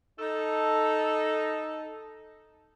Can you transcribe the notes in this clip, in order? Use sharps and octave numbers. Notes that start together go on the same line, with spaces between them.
D#4 A4